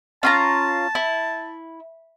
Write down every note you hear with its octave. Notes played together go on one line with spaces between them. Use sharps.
C#4 F4 A5 A#5
E4